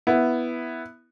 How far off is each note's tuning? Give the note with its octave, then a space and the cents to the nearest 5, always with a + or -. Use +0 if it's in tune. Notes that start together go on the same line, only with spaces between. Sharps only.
B3 +0 E4 +0